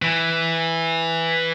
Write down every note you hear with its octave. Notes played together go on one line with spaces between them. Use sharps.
E3